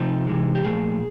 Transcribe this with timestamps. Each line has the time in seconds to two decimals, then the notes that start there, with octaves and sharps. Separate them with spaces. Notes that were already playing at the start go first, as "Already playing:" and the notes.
Already playing: C3 F3 A3 C4 D#4
0.27 C3 E3 G#3
0.55 G4
0.64 A#2 F3 A3 G#4